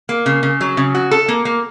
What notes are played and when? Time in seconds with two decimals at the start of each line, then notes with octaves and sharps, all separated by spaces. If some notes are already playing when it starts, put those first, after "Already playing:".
0.09 A#3
0.26 C#3
0.43 C#3
0.61 F#3
0.77 C#3
0.95 F#4
1.11 A4
1.28 A#3
1.45 A#3